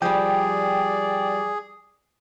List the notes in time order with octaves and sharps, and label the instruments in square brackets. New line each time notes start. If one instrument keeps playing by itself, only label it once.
[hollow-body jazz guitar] F3 G3 [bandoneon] G#4 [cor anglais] D5 [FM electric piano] G5